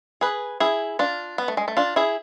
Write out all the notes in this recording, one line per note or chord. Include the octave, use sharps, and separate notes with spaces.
G#4 B4
E4 G#4
D4 F4
B3
A3
G#3
A3
D4 F4
E4 G#4